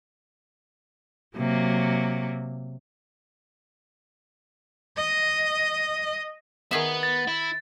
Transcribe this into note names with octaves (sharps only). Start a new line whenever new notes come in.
C3 F#3 A#3
D#5
D#3 B3 G#4 E5
A6
E4